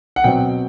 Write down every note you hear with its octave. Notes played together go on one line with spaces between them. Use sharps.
F#5
B2 F#3 C4 G5